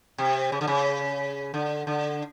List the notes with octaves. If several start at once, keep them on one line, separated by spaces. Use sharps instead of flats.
C3
C#3
D3
C#3
D3
D3